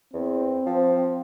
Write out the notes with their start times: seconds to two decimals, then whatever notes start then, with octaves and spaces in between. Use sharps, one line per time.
0.14 E2 C4
0.66 F3